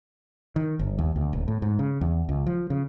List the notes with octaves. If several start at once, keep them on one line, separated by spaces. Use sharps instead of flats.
D#3
G1
D#2
D2
D#1
A2
G#2
C#3
E2
C#2
F3
C#3